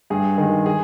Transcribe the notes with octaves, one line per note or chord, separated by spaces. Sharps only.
G2 G#4
D#3 G#3
G#4